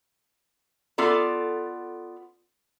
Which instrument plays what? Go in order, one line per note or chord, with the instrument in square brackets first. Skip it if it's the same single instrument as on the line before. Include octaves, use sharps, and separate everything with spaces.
[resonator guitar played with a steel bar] B3 F4 A4 D5